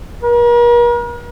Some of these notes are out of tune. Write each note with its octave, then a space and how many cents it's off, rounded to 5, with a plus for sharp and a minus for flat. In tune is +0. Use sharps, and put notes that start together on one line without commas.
A#4 +40